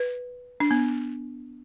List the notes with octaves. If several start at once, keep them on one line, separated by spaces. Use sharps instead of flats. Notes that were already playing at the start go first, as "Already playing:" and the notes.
Already playing: B4
D4
B3